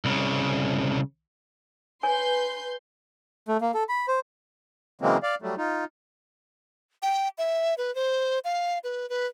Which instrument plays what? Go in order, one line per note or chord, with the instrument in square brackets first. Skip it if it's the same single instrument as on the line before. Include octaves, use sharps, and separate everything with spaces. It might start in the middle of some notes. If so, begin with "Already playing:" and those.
[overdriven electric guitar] C2 C#3
[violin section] B4 C6 G6 [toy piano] C#5 G#5
[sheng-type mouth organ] A3
A#3
A4
B5
C5
[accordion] C#3 E3 F#3 G#3 A#3 C4
D5 F5
F#3 G3 A3
D#4 F4
[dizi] G5
E5
B4
C5
F5
B4
B4